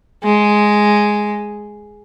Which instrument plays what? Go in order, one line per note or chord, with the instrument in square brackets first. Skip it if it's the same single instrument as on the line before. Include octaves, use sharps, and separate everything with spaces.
[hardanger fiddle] G#3